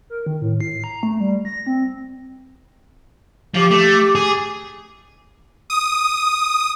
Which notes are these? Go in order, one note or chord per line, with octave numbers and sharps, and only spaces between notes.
A#4
D#3
A2
C7
A#5
A3
G3
A#6
C4
F3 G4 D6
A3
G#4
D#6